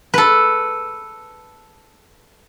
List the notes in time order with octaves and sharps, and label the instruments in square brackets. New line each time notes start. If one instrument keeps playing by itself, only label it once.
[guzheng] A4 B4